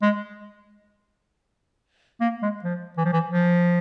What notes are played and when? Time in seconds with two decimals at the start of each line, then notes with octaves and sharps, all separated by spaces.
0.02 G#3
2.21 A#3
2.42 G#3
2.64 F3
2.98 E3
3.05 F3
3.13 E3
3.31 F3